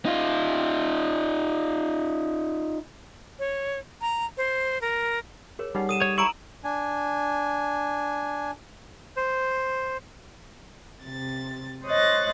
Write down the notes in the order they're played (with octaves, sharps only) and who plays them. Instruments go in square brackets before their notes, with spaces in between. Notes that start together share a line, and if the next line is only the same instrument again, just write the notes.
[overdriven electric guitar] D#4 F4
[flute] C#5
A#5
C5
A#4
[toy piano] G#4 A#4 C#5
[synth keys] G3 C#4 [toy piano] D#4 G#4 F#5
[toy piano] A4 F#5 [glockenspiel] D#6 D#7 E7
[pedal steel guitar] C#5
[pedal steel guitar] E4 C#6 [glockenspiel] A#5 D7 F#7 [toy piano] E6
[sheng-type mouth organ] D4 G#5
C5
[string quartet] C3 A6
C5 C#5 D#5 F#6 A6 A#6